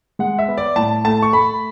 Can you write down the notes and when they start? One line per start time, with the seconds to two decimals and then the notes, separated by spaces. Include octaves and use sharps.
0.19 G#3 F#5
0.39 E5
0.48 B3
0.58 D5
0.76 A2 A5
1.04 A3 A5
1.22 C#6
1.33 A3 B5